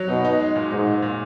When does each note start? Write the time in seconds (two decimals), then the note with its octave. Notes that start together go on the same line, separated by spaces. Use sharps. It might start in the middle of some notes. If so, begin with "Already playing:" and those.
Already playing: F#3
0.09 B2 D#4
0.25 D#4
0.40 G#3
0.56 A#2
0.71 G#2 D#4
0.87 A#2
1.02 A#2